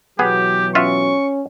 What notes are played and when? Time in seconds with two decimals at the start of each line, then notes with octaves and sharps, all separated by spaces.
0.19 B2 E3 F#3 B3 G4 G#4
0.75 C#4 F4 F#4 E5 C#6